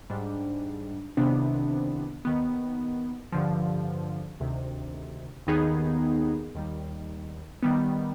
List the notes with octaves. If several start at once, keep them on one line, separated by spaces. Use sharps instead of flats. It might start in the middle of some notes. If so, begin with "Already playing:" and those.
G#2 G3 D4
C2 C3 D#3 B3 D4
D#2 D#3 B3
G2 D3 F3
D2 C3 D#3
D#2 D#3 B3 D#4 G#4
D#2 D#3 G3
D#3 G3 B3